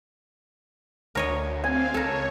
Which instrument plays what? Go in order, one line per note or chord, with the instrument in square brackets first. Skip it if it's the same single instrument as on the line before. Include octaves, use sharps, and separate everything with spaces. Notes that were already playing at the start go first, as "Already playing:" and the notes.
[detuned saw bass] D2 [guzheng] A#4 C#5 D#5
[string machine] C4 F5 [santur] G#5
[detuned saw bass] C#2 [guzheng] A4 A#4 [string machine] C#5